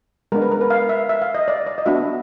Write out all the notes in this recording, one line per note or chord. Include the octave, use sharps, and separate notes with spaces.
G#3 B3 D4 A#4
B4
A#4
B4
F5
E5
E5
F5
D#5
D5
D5
D#5
B3 D4 F#4 E5